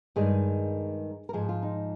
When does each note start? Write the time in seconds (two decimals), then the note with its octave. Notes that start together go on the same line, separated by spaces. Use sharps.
0.16 G2 D#3 G#3 G#4
1.29 A#4
1.33 G#2 F3 G#3 G#4
1.49 F4
1.62 D#4